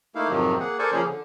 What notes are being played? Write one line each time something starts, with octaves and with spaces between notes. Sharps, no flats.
A3 A#3 D#4 E4 F5
F2 G#2 C3 D#3 F3 F#3
A#3 G#4 F#5
A4 A#4 C5 D5 G#5 C#6
C#3 F3 A#3 C#4 G#4
D3